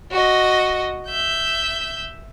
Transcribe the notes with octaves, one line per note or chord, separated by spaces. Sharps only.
F#4 D#5
E5 G6